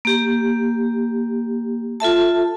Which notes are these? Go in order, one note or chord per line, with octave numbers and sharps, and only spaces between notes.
A#3 G4
F4 A4 E5 A5